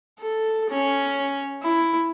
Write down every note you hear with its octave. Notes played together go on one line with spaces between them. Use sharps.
A4
C#4
E4